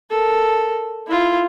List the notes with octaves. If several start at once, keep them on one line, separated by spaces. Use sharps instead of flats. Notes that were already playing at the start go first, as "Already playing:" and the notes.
A4 A#4
E4 F4